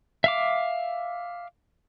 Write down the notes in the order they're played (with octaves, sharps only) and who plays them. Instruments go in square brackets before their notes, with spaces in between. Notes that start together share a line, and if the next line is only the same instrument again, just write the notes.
[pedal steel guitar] E5 F5 D6